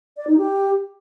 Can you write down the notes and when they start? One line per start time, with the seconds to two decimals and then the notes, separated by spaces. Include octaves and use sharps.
0.17 D5
0.27 D#4
0.38 G4